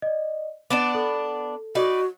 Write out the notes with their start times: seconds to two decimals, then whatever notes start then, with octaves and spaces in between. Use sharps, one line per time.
0.02 D5 D#5
0.70 B3 D4 D5 D6 D7 E7
0.95 A4
1.75 D#4 F#4 B4 D5